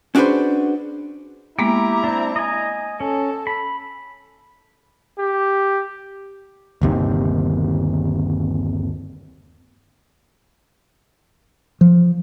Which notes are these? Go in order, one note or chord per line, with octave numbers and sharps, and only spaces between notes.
C#4 D4 F#4 G#4 B4 C5
G#3 A#3 B3 E4 G4 A#5
C4 D4
D#5 G#5
C#4 A4
B5
G4
G1 D#2 C3 D#3
F3